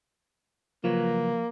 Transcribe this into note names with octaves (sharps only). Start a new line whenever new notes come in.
C#3 F3 F#3 A#3 B4